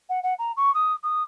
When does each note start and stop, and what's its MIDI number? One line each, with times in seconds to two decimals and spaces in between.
0.09 0.20 78
0.23 0.34 78
0.39 0.52 82
0.57 0.73 85
0.75 0.93 87
1.04 1.23 87